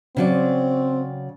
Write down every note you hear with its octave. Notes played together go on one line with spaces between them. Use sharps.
C#3 F#3 C4 D5